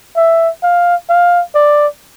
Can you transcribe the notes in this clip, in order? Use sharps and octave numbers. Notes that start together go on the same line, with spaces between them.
E5
F5
F5
D5